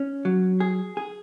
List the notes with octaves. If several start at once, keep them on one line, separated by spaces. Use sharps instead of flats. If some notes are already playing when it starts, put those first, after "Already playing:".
Already playing: C#4
F#3
G#4
G#4